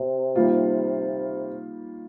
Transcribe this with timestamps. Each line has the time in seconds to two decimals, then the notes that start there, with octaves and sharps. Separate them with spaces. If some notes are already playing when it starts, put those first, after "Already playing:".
Already playing: C3
0.36 D#3 G3 A#3 F4